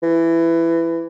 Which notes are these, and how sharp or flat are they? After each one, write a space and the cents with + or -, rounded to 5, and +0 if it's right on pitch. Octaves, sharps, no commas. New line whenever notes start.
E3 +15